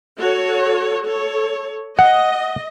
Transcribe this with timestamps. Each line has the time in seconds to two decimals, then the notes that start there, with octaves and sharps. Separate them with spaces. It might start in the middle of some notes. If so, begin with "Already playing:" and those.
0.17 F#4 A4 C#5
1.04 A4 C#5
1.99 D#5 F#5